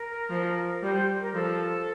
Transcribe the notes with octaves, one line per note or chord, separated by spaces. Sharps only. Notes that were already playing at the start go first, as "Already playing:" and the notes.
Already playing: A#4
F3
G3 C5
C5
A#4
F3 A4